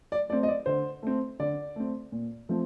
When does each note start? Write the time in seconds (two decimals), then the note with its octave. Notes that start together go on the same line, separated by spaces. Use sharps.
0.12 D5
0.30 A3 C4 D5
0.43 D#5
0.48 D5
0.66 D3 C5
1.03 A3 C4
1.40 D3 D5
1.76 A3 C4
2.12 A#2
2.49 F3 A3 C4